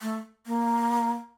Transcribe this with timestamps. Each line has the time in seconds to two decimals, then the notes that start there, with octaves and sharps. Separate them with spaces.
0.02 A3
0.47 A#3